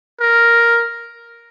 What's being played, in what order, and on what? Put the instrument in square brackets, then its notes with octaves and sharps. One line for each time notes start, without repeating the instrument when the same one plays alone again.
[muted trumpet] A#4